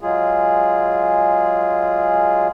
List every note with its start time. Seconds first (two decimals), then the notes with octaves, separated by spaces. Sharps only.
0.01 F#3 G#3 F4 G#4